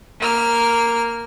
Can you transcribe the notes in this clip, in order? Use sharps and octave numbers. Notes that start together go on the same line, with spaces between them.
A#3 F6